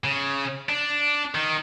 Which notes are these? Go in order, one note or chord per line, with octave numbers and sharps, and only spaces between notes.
C#3
D4
D#3